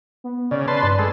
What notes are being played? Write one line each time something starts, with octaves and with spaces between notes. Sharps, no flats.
B3
C#3 D5
B4 A5 C6
G2
G#3 A4